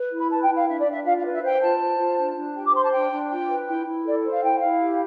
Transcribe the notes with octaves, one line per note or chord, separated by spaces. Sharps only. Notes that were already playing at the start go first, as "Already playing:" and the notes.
Already playing: B4
E4
B5
B4 A5
G5
E4
F5
D4 E5
D5
D4
E5
F4 F5
F5
B4
E5
C5 G5
F4 A5
C5
F4
D4
D4
G4 G5
D6
C5 C6
A5
D4 G5
D4
F4 G5
B4
E4 G5
E4
A4 D5
C5
F5
E4 G5
E4 F5
G4